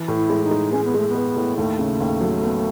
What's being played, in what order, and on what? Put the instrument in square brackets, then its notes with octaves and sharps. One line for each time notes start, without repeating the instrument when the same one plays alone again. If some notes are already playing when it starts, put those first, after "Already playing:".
Already playing: [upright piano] E3
A2
[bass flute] E4
[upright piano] G#3
[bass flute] D#4
[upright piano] G#3
[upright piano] G#3 [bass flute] C#4
[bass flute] B3
[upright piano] G#3 [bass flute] A3
[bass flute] B3
[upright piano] G#3
A2
[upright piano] D#2 [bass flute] A3
[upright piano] C#3
D#2
F#3
B3